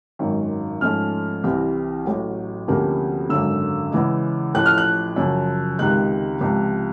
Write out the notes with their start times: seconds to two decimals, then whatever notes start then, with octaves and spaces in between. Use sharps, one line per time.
0.19 G#1 F#2 D#3
0.81 G#2 F3 A3 C#4 F6
1.44 C2 C3 E3 G3 C4
2.05 A1 A2 F#3
2.68 D2 C3 F3 A#3 C#4
3.29 G#1 F#2 D3 E6
3.92 E2 C#3 E3 G#3
4.54 A1 A2 F3 F#6
4.66 F6
4.78 F#6
5.16 F#2 C#3 F3
5.79 C#2 C3 D#3 G#3 F#6
6.41 C#2 C3 F3